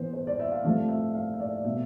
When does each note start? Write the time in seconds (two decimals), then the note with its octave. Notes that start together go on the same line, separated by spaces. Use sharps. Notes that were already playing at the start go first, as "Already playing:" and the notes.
Already playing: E3 B3 C5
0.13 C5
0.27 D5
0.40 E5
0.52 F5
0.64 C3 F3 A3 C4 F5
0.89 E5
1.15 F5
1.33 E5
1.40 D5
1.65 B2 A3 C4 E5